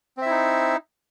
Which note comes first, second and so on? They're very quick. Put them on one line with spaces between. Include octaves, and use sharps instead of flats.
C4 E5 E4 D#4